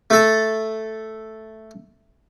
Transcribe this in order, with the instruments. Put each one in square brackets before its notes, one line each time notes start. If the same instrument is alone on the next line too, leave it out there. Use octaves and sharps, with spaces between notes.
[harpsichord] A3 A4 A5